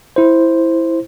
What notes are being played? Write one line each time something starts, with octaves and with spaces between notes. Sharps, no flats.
E4 C5